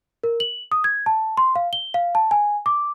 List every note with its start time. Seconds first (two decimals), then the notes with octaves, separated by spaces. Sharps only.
0.24 A#4
0.40 F#7
0.72 D#6
0.84 G#6
1.06 A5
1.37 C6
1.56 F5
1.73 G7
1.94 F5
2.15 A5
2.31 G#5
2.66 D6